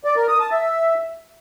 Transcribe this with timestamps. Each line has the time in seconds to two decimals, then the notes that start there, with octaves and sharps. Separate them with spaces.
0.04 D5
0.16 A#4
0.28 D#6
0.40 A5
0.52 E5